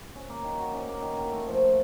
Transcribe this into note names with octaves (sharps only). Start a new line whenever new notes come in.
C#4
A#3
D#3
F#4
C#4
A#3
D#3
D#3
A3
F3